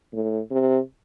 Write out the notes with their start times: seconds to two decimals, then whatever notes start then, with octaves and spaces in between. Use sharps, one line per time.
0.13 A2
0.51 C3